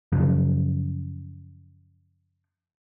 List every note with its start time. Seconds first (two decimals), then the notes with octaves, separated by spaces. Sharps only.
0.12 F#2 C#3 F3